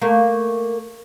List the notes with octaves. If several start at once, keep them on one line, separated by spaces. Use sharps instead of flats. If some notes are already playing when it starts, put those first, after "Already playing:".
A3 A#3 F5